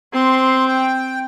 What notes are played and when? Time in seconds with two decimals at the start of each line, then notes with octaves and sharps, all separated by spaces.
0.13 C4 C6
0.67 G5